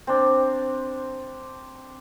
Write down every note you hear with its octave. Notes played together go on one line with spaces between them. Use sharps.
C4 D4